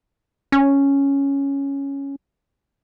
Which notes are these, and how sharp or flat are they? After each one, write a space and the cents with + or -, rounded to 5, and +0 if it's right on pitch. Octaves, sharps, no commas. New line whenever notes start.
C#4 +0